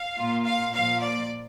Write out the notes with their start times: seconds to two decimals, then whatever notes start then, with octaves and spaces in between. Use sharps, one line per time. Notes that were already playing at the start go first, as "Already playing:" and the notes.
Already playing: F5
0.16 A#2 A#3 F4
0.45 F5
0.74 A#2 F3 A#3 F5
1.02 D5